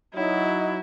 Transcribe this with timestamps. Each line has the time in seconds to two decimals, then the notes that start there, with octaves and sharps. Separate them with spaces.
0.14 F#3 D#4 E4